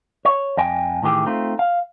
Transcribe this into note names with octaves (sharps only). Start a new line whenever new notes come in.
C#5
F2 D#5 G5 G#5
A2 D#3 E3 G4 G#4
A3 C4 D#4 F4
F5